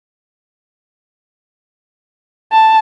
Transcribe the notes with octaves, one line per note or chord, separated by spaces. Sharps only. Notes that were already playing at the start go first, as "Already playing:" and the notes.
A5